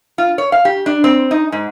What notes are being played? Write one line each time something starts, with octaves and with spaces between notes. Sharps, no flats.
F4
C#5
F5
G4
D4
C4
D#4
G#2